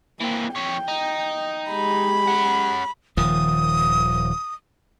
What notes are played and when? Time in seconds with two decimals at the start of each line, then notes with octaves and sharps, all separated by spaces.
0.20 E3 A#3 C4
0.55 F2 C#5 G5
0.88 D#4
1.71 G#3 G4 B5
2.27 C#4 F#5
3.17 D#1 D#3 F3 D#6